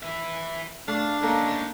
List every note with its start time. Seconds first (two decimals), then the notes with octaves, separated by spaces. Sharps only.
0.03 B4 E5
0.88 A3 D4 F5
1.23 A#3 C#4 D#4 A4